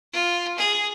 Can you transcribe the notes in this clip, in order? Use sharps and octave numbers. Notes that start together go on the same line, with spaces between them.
F4
G#4